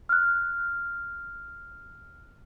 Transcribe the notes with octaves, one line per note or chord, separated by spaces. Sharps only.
F6 F#6